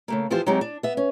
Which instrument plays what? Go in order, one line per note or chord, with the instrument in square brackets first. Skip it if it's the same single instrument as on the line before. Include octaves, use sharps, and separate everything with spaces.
[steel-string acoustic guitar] C#3 A3 A#3
E3 F3 F4 G4 C5
F#3 G#3 C4 D#4 G4
D4
B3 E5
C#4